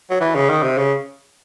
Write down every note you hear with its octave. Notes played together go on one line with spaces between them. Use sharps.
F#3
E3
C#3
D#3
C3
C#3